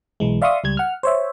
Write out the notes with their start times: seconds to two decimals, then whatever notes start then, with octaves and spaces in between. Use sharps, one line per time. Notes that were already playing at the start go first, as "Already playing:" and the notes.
0.20 B1 E3 G#3
0.42 D5 E5 F5 C6 C#6 D#6
0.64 C#2 G3 G#6
0.77 F#5 F6
1.03 C5 C#5 E5